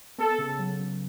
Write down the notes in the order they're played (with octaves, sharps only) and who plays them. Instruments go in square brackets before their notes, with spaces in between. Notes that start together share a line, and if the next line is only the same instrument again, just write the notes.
[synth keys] B3 [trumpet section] A4
[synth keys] C#3
F#3
C#3